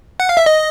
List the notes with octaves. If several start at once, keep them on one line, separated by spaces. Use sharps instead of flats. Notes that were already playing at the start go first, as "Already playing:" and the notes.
F#5
F5
E5
D#5